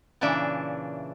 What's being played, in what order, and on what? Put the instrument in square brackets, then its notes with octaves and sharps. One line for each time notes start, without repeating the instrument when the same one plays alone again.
[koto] A#2 C#3 E3 D4 E5